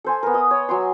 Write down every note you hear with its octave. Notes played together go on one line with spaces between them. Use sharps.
A4 C5 G#5
B3 A#4
D#5 D#6
C#5
F#3 G#5 C6